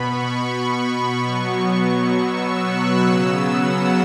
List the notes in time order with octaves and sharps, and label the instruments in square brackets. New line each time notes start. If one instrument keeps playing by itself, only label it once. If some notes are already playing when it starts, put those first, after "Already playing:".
Already playing: [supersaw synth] B2 B3 B5 C#6
B2 F#3 B3
E6
F#6
C#3 F#3 B3 E6
F#5